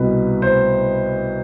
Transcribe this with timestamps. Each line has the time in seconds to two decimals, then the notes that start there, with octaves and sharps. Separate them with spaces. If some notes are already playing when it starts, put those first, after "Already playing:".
Already playing: C2 B2 B3 B4
0.42 C5